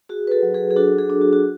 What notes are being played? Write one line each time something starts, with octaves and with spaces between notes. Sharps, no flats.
F#4 G#4
B4
F#4 A4
F#3
G#4 B4
G#4
D4 F#4 A4
G#4
D4
F#4
F#4